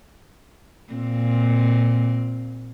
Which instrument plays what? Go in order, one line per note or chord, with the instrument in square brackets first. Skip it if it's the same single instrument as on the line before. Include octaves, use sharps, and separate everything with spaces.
[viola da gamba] A#2 C4